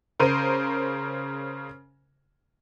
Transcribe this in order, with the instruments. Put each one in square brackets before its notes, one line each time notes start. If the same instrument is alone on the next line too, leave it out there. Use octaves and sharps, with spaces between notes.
[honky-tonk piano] C#3 A#4 C5 D#7